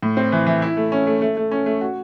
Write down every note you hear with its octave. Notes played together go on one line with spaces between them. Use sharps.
A2
C4
E3
E3
E4
A3
C#4
A3
A3
A3
C#4
A3
F#4